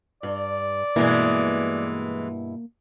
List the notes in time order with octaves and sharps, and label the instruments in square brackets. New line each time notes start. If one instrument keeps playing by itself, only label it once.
[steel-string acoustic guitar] G2 [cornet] D5
[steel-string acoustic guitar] G2 B2 E4 [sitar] E3 G#3 [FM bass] A#3